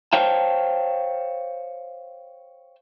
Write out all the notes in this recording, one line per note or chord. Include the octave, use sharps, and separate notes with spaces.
C5 C#5 F5 G5 A5